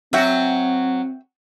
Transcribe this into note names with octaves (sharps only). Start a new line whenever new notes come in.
F#3 C4 F#4 E5 G5